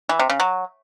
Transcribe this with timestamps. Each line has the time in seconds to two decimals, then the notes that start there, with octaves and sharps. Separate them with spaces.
0.09 E3
0.19 C3
0.30 C#3
0.40 F#3